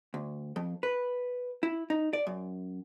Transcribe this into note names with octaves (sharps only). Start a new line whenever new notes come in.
D2
F2
B4
E4
D#4
D5
F#2